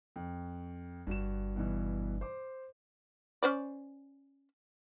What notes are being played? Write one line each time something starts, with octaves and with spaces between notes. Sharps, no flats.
F2
G1 G2 F#4 E7
G2 B2 E3
C5 D6
C#4 C5 D5